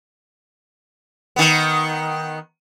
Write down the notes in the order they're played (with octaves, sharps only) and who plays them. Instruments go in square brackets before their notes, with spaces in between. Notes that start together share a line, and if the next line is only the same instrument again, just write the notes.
[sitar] D#3 B3